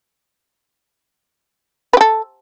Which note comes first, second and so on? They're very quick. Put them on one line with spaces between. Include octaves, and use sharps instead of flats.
B4 G4 A4